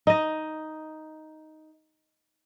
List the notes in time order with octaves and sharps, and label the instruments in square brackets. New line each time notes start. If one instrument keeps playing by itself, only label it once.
[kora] D#4 D#5